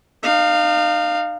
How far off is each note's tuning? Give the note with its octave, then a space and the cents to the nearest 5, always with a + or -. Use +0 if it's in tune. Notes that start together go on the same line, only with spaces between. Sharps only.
D#4 -35 F5 +0